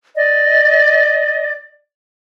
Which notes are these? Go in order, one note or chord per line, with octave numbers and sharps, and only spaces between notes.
D5 D#5